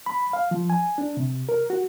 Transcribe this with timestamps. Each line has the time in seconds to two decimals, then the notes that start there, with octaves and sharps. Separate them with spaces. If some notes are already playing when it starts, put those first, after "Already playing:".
0.06 B5
0.33 F5
0.51 F3
0.70 G#5
0.98 D4
1.17 C3
1.49 A#4
1.70 F#4